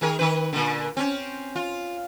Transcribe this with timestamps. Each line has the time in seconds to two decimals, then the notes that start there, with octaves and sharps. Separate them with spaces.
0.01 D#3 G#4 A#4
0.19 D#3 B4
0.53 A#2 D3
0.97 C4 C#4
1.56 F4